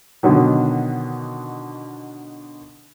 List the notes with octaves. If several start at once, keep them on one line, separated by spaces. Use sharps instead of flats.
B2 D3 D#3 F#3